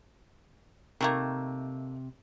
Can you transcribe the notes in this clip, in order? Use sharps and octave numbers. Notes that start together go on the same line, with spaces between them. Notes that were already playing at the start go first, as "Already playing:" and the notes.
C3 D#3 A3 A#3